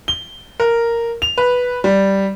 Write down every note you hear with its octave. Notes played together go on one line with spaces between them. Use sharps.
G7
A#4
F7
B4
G3